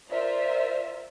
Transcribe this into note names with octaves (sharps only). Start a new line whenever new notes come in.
F4 A#4 C5 D5 E5